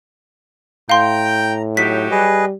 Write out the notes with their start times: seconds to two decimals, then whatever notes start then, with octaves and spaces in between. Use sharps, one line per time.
0.90 A2 F5 G5 A#5 C6
1.77 F#3 D#4 G4 B6
2.11 G3 G#4 B4 D#5